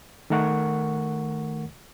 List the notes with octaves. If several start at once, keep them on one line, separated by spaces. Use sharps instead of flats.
D#3 A3 A#4 F#5 C#6